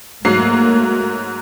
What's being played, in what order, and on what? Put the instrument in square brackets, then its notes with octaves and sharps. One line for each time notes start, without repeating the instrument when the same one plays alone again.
[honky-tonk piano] G#2 F#3 C7 [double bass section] A3 A#3